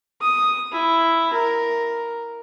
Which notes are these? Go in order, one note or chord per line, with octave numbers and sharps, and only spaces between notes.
D#6
E4
A#4